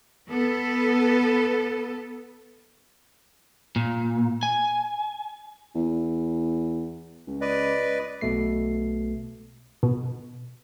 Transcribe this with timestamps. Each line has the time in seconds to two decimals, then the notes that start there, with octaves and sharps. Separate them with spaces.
0.28 B3 A4
3.76 A#2
4.43 G#5
5.75 E2
7.27 C#2
7.41 B4 D5 D#5
8.21 B1 B2 A3 C7
9.83 B2